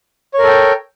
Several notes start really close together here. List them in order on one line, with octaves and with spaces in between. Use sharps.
C#5 A#4 A4 G5